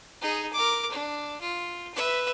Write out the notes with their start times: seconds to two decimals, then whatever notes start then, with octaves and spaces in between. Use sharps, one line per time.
0.21 D#4 G#4
0.53 A#4 D6
0.91 D4
1.41 F4
1.94 B4 E5